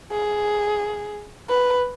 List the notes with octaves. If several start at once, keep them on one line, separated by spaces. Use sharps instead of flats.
G#4
B4